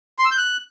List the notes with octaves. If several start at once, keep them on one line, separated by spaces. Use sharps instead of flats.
C6
E6
G6
F#6